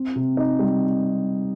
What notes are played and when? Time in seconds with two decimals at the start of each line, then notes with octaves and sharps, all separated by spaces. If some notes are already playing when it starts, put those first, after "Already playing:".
Already playing: C4
0.16 C3
0.37 D#4
0.59 G3